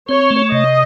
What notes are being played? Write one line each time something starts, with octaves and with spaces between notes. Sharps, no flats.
C4 C#5
A3
C3 D#5